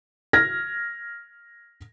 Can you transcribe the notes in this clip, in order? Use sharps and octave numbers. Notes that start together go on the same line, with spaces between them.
F6 G#6 A#6